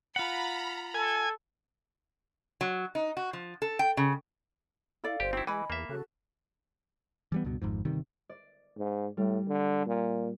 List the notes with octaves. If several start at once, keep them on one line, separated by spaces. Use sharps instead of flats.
F4 F#5 A#5 B5
A4 G#5
F#3
D#4
F#4
F3
A4
G5
C#3
E4 A4 D5 F5
G1 G4 C5
C4 D#4 E4 F#4 G5
E3 G#3 D#5 G#5 B5
E2 A#3 E5
C#3 F#4 A4 F#6
E3 G3 B3
C#2 G2 B2
G#1 F2 G#2
G1 C3 D#3 G3
D5
G#2
A2 G3
D3
A#2